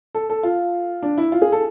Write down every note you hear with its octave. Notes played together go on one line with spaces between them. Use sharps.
A4
A4
F4
D4
E4
F4
G#4
A4